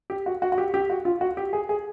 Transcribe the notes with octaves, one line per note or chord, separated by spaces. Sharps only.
G4
F#4
F#4
F#4
G4
G4
F#4
F4
F#4
G4
G#4
G#4